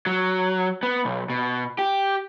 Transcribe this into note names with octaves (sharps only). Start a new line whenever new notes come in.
F#3
B3
B1
B2
G4